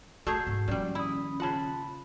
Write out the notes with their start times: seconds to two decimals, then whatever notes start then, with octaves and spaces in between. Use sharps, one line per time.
0.27 A3 A#3 F#4 G#4 A#5 G6 C7
0.47 G#2
0.68 A#2 D#3 F3 G3 C#4
0.95 E4 B5 D#6
1.40 C#3 F4 F#5 A5 B5